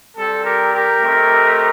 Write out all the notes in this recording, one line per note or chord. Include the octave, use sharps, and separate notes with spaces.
G3 C4 G4 A4
G4 A#4
G4 A#4
A3 C4 D#4 G4